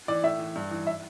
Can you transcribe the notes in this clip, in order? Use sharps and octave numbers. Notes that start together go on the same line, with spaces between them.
E3 D5
A2 E5
E3
G2
E3
E5